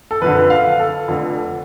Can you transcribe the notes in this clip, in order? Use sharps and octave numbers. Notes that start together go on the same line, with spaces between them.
A4
F#1 F2 D3 B4
F5
A4
F1 F2 D3